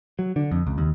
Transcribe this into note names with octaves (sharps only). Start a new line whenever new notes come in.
F#3
D3
F2
C#2
D#2